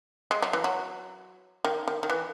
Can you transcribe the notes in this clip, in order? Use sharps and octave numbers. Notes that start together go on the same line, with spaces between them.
G#3
F#3
E3
F#3
D#3
D#3
D#3
E3